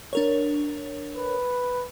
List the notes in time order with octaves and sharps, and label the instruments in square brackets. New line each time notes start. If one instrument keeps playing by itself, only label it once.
[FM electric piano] D4 A#4 C#5
[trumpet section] B4